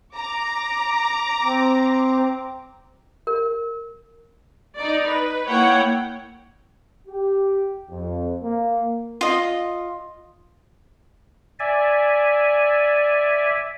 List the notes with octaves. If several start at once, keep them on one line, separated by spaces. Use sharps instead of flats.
A#5 D6
C4
A#4
D#4 D5
B4
A#3 E4 C#5 F#5 G5
G4
F2
A#3
F4 D#5
D5 E5 G#5